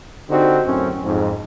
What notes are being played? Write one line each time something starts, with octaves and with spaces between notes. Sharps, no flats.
D3 C4 D#4 F#4 G4
F#2 A2 C4 C#4
F2 G#2